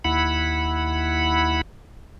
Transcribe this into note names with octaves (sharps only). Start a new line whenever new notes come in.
D#2 E4 F#5 B5